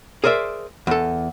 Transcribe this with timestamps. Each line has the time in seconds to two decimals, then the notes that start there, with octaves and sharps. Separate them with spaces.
0.24 G#4 A#4 C5 D5 E5
0.87 E2 A4